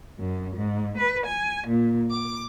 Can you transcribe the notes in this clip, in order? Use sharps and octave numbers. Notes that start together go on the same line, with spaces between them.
F#2
G#2
B4
G#5
A#2
D6